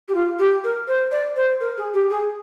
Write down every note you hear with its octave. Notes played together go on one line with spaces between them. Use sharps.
G4
F4
G4
A#4
C5
D5
C5
A#4
G#4
G4
G#4